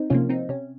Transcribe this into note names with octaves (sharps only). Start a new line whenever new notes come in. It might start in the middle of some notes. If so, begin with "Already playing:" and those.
Already playing: C4 D#4
C3 F3 A#3 C#4 F4
C4 D#4
C3 C#4